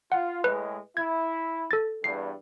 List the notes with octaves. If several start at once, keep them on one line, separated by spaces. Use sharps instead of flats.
F4 F#5
A2 G#3 B4
E4 G#6
A4 A6
E2 G2 C7